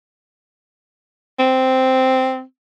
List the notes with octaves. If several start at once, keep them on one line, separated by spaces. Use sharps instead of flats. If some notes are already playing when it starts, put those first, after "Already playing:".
C4